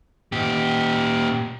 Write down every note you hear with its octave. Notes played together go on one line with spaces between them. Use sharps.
A#2 G4